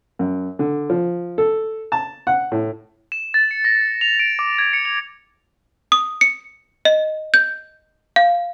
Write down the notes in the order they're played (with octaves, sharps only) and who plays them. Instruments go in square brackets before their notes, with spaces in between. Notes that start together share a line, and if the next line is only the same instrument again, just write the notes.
[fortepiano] F#2
D3
F3
A4
A5
F#5
A2
[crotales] E7
A6
C#7
A#6
F7
D7
D6
G#6
C#7
F7
[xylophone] D#6
C#7
D#5
G6
F5